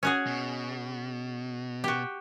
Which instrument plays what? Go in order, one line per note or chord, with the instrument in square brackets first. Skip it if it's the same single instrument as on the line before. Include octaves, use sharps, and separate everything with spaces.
[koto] C#4 F#4 G#4
[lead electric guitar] B2
[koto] F#4 G4